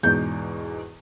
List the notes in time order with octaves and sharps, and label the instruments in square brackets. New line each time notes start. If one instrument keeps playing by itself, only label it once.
[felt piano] E2 G#2 B2 [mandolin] G6